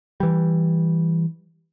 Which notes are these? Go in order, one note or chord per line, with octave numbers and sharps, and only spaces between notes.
E3 G3